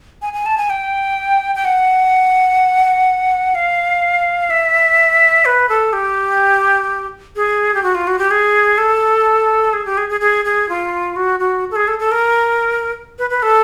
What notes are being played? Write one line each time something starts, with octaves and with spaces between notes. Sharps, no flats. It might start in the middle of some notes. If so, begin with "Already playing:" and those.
G#5
G#5
A5
G#5
G5
G5
F#5
F5
E5
B4
A4
G4
G#4
G4
F#4
F4
F#4
G4
G#4
A4
G#4
G4
G#4
G#4
G#4
G#4
F4
F#4
F#4
A4
G#4
A4
A4
A#4
B4
B4
A4